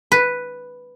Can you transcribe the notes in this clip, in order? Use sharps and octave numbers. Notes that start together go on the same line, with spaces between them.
B4